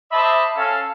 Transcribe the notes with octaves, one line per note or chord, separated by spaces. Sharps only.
C5 D#5 E5 A5 B5 D6
C#4 A4 F5